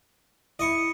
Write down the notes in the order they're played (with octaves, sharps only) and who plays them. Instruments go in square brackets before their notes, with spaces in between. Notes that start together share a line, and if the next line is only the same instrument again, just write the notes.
[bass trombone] E4 [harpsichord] D#5 C#6